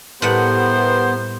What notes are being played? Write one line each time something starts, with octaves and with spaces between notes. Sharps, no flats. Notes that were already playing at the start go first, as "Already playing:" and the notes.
A2 G3 B3 E4 G4 A#4 C5 F#5